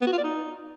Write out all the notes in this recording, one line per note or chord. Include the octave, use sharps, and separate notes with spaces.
B3
F#4
F4
D5
D#4